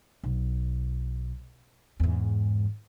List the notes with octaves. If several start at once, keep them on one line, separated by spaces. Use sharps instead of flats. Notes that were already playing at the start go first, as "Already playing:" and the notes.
B1
E2 G#2